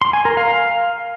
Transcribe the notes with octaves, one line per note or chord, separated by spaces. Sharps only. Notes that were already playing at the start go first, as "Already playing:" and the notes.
C6
G#5
A#4
F5